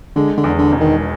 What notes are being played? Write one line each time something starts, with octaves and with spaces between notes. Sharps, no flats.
D3 G#3
D3
E2
D3
E1
D#3